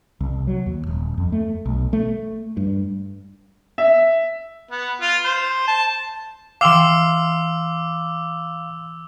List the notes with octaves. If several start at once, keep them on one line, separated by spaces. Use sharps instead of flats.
C2
F#3
D#2
D#1
F2
A3
B1
A3
G2
E5
B3
F4
C5
A5
E3 F5 G5 C6 D6 E6 E7 F7